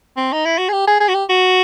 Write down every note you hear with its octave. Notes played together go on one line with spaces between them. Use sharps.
C4
D#4
E4
F#4
G#4
G4
G#4
G#4
F#4
G4
F#4